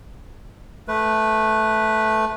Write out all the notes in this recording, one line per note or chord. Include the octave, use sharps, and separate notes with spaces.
A3 B4